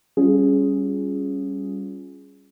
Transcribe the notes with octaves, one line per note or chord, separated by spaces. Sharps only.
G3 C#4 F4 G#4